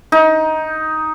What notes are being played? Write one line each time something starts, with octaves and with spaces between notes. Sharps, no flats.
D#4